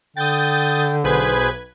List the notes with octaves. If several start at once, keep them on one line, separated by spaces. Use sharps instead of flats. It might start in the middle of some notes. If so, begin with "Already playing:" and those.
D3 G5 D#6 G6 A6
B1 G#4 B4 C5 G#6